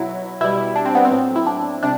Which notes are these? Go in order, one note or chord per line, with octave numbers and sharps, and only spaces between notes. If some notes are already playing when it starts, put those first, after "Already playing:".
Already playing: B2 F#3 E4
B2 G3 E4
D4
C4
B3
C4
A2 F#3
E4
D4
C3 G3 D4